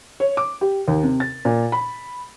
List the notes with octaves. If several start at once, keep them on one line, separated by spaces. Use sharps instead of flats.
C#5
D6
G4
D#2
C3
A6
A#2
B5